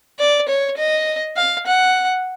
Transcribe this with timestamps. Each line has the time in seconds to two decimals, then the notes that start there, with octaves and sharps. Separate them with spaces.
0.19 D5
0.49 C#5
0.78 D#5
1.36 F5
1.66 F#5